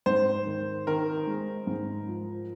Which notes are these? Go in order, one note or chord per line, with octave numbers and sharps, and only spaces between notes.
G#2 C5
D#3
D#3 A#4
G#3
G#2
F3